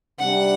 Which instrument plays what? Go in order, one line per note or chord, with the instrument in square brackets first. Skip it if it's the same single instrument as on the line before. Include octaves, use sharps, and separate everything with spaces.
[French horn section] C3 G3 D4 [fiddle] F#5